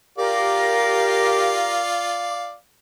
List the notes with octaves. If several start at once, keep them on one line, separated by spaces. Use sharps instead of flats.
F4 G4 A#4 D5 F5